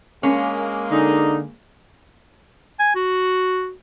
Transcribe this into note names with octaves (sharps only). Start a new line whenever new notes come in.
G#3 A#3 C#4
D3 D#4
G#5
F#4